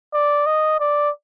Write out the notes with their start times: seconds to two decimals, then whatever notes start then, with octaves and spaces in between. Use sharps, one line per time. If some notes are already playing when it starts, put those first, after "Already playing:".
0.14 D5
0.46 D#5
0.80 D5